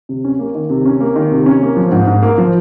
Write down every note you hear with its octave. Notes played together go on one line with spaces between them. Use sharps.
C3
C#4
A#3
D#3
C3
C#4
A#3
D#3
C3
C#4
A#3
F3
G#2
G#2
A#3
F3